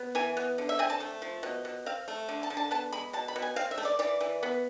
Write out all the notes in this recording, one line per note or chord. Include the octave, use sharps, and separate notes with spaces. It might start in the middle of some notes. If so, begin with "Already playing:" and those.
Already playing: B3
E3 G#5
B3
D3
E5
C4 G#5
A5
A3
F3
B2
B2
C4 F5
A3
D3
A5
D3
A5
B3 A5
G#3 B5
B2 A5
B5
B2
G#5
C4 F5
E5
A3
D5
E3 D5
E3
B3